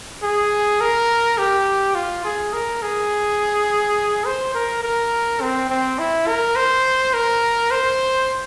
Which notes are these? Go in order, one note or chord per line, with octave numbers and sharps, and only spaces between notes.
G#4
A#4
G4
F4
G#4
A#4
G#4
C5
A#4
A#4
C4
C4
E4
A#4
C5
A#4
C5